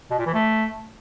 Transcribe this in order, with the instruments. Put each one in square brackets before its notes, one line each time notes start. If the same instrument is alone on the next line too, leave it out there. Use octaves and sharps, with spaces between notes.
[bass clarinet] B2
A#2
E3
A3